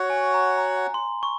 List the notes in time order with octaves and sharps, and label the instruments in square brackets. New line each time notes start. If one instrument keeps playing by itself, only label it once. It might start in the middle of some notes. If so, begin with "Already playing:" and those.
Already playing: [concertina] F#4 C#5 F#5
[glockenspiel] G#5
A#5
A#5
C6
C#6